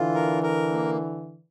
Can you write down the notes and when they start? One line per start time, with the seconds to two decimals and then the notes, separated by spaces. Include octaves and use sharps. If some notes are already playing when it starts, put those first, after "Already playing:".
Already playing: D3 E3 F4
0.14 A#4
0.43 A#4
0.72 A#3